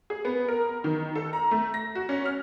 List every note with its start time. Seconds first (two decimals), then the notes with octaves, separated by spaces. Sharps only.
0.10 G#4
0.25 B3
0.48 A#4
0.84 D#3
1.15 A4
1.33 A#5
1.51 A3
1.74 A#6
1.95 F#4
2.09 C#4
2.26 F6